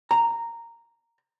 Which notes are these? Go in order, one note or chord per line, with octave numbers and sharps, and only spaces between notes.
A#5